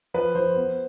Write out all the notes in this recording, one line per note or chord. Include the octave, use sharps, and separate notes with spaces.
F3 B4
F3 C5
B3